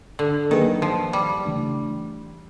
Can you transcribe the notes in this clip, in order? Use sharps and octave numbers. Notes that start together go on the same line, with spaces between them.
D3
D#3 F#3 A#3 D#4 G#4 B4
F3
G3
C#3 E3 A3 D4